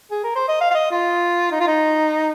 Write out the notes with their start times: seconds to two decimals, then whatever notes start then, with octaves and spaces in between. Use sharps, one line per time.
0.11 G#4
0.24 A#4
0.36 C5
0.48 D#5
0.61 F5
0.71 F5
0.75 D#5
0.91 F4
1.52 D#4
1.61 F4
1.67 D#4